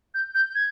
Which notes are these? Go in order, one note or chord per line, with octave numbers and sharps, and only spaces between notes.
G6
G6
G#6